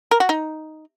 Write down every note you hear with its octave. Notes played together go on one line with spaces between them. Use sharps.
A#4
F#4
D#4